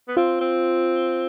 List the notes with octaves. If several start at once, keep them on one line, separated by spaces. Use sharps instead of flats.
B3
C4 F4
C4